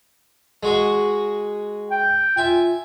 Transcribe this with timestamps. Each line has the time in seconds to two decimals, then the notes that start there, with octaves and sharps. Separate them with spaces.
0.63 G#3 F#4 G#4
1.91 G5
2.37 F4 E5 G#5